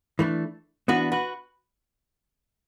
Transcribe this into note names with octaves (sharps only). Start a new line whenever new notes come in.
E3 A3 D4
E3 B3 D4 F#4 B4
F#4 B4